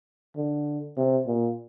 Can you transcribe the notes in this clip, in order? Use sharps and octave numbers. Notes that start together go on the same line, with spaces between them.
D3
C3
A#2